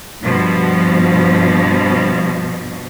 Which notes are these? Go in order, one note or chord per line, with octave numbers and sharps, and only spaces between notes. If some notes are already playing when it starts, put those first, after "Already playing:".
G2 B2 F3